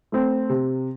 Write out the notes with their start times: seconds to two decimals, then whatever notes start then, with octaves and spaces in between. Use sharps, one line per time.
0.12 A3 C4
0.49 C3